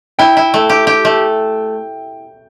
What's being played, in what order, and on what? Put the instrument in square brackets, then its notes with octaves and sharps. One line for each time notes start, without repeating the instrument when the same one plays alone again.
[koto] E4 [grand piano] G5
[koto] E4
A3
G4
G4
A3